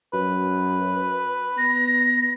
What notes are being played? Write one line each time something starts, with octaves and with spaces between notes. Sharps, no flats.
F#2 B4
B3 A#6